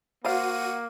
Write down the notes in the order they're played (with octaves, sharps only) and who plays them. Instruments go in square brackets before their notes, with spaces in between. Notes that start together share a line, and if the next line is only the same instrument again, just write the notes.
[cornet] A#3 [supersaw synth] F#4 D#7 [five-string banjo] C5 D5 F5 [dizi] F#5